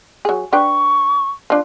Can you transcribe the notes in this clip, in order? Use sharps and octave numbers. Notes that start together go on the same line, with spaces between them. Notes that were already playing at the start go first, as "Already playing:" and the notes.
F#3 G#4
D4 B4 G5 C#6
F3 D4